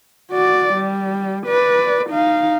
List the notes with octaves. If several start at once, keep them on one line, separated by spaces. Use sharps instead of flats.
F#4 D5
G3
B4 D5
D#4 F5